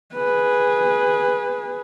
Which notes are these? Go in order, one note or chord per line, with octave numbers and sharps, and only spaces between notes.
G#4 B4